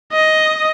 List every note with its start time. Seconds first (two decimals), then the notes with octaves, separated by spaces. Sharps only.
0.13 D#5